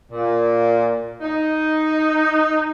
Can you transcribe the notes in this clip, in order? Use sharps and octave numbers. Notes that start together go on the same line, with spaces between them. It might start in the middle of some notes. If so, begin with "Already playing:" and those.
A#2
D#4